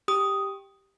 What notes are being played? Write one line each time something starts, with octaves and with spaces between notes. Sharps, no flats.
G4 D#6